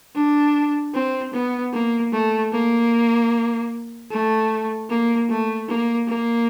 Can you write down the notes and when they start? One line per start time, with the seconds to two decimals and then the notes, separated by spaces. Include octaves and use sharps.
0.15 D4
0.94 C4
1.33 B3
1.73 A#3
2.12 A3
2.52 A#3
4.11 A3
4.90 A#3
5.29 A3
5.69 A#3
6.08 A#3